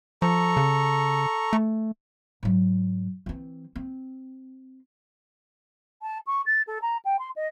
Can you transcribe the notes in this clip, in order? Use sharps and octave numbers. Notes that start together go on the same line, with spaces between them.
F3 A4 A#5 C#6
C#3
A3
G#2 F#3
E3 C4
C4
A5
C#6
A6
A4
A#5
G5
C6
D#5